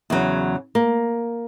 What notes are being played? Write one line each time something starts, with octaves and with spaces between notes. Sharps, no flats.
E2 C#3 F#3
A#3